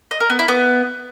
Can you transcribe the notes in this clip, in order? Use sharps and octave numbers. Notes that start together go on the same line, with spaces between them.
D#5
A#4
B3
E4
B3